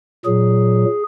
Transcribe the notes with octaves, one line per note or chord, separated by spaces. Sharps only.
A#2 F#3 G#4